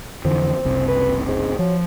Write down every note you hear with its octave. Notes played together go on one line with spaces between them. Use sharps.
F2 D3 E3 C4
F#1 C2 C3
B4
G#2
F3 F#3